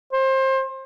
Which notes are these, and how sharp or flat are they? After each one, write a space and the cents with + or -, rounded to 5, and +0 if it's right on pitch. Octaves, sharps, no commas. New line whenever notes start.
C5 +25